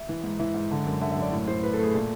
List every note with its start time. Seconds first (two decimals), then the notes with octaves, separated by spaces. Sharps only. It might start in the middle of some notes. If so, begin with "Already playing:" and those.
Already playing: E5
0.09 E3
0.23 G#2
0.39 E3 E5
0.54 G#2
0.71 D3
0.86 F#2
1.01 D3 E5
1.12 F#2 E5
1.22 D5
1.32 A2
1.48 A2 C5
1.62 A2 B4
1.73 A4
1.79 A3 G#4
1.94 A#2